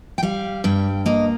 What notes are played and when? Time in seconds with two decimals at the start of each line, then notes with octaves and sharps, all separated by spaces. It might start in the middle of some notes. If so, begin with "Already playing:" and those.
0.18 G5
0.23 G3 F5
0.64 G2 G5
1.06 A#3 D#5